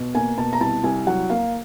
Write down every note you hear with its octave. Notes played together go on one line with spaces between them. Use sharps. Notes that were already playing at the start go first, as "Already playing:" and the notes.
Already playing: B2
A#3 G#5
B2 A5
A#5
C2 A5
C2 G#5
F#3 F#5
A#3 F5